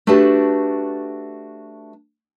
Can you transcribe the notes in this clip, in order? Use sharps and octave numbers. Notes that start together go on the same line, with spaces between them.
A3 D4 F#4 G4 B4 A5